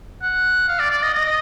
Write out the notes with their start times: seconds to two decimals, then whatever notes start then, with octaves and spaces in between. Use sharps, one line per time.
0.22 F#5
0.68 F5
0.79 D5
0.91 D5
1.02 D#5
1.14 D#5